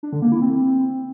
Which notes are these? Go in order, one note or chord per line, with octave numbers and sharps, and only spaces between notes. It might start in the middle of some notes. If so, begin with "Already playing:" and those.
D4
D3
A#3
E4
C4